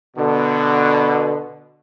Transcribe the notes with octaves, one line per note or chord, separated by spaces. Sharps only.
B2 D3